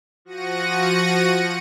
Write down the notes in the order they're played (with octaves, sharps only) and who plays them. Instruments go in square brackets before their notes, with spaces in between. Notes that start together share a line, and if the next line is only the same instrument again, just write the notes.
[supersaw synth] F3 F#4 F#5 A#6 C#7 D#7